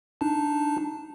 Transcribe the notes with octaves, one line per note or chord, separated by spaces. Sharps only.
D4 D#4 A5